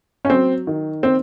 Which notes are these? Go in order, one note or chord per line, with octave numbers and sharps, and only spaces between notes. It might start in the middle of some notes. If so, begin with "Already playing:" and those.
C#4
F#3 C4
D#3
C4